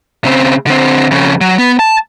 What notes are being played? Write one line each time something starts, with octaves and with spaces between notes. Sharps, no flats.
C#3 C4
D3 C4
F2 C#3
F#3
B3
A5